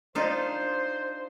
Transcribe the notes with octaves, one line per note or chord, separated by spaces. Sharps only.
D4 D#4 F4 C5